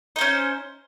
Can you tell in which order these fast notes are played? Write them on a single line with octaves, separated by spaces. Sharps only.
D#4 C5 C#4